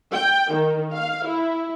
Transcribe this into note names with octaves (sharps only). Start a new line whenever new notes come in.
G5
D#3
F5
E4